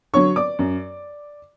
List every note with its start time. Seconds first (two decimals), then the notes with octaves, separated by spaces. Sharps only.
0.14 D3 F#3 C#5 C#6
0.36 D5 D6
0.59 F#2